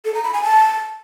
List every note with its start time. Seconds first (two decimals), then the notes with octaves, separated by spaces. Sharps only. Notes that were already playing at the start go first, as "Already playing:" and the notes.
0.05 A4
0.14 A#5
0.24 B5
0.34 G#5
0.43 A5